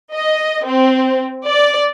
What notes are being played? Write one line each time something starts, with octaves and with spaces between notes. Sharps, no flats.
D#5
C4
D5